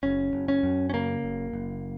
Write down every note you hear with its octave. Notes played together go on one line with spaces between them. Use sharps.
F#1 C#4
F#1
C#4
F#2
C#4
C#3 A#3
F#1
F#1